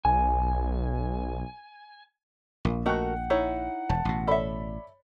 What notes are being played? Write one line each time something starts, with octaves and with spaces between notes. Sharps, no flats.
B1 G#5
A#1 A#2
A3 F#4 A#4 D#5 F#5 G5 F#6
D#4 E4 C#5
E1 A5
A1 B2
A4 C#5 D5 E5 B5